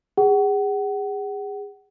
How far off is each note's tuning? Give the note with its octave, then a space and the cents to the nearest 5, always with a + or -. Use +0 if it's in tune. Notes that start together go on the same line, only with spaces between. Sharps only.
G#4 -30 F#5 +30